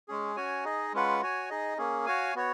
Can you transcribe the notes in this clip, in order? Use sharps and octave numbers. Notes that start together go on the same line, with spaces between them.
G#3 C#4 G#4
C#4 F#4 C#5 G#5
D#4 G#4 D#5
G#3 C#4 F4 B4 F#5
F#4 C#5 G#5
D#4 G#4 D#5
A#3 C#4 G#4
F#4 C#5 F5 G#5
B3 F#4 C#5